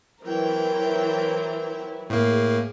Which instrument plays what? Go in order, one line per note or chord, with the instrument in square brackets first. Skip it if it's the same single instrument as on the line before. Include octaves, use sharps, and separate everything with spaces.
[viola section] E3 F#3 E4 [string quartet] A#4 C5 G5
[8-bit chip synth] A2 A#3 [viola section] G#4